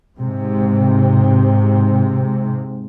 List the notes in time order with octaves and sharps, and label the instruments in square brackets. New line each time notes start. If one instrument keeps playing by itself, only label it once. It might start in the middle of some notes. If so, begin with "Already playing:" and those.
[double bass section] G#2 C3